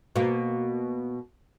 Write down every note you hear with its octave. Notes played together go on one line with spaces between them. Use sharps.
B2 A#3